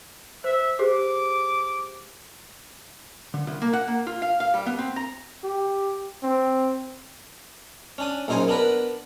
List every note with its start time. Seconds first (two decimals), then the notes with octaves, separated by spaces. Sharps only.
0.44 C5 E5
0.79 G4 G#4 C5 D6
3.34 D3
3.47 C2
3.62 A#3
3.73 F#5
3.88 A#3
4.07 F4
4.22 F5
4.40 F5
4.54 G3
4.66 B3
4.79 C4
4.96 A#5
5.44 G4
6.23 C4
7.98 C#4 D4 D#6
8.28 A#1 F#2 D#4 C5 G#5
8.48 B3 D4 A#4 B4